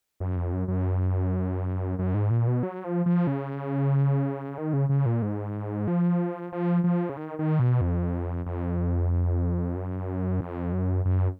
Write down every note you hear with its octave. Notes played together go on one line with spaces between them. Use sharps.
F#2
F2
F#2
F#2
F#2
G#2
A#2
B2
F#3
F3
F3
C#3
D#3
C#3
C#3
A#2
G#2
F3
F3
F3
C#3
D#3
D#3
B2
F2
F2
F#2
F2
F#2
F#2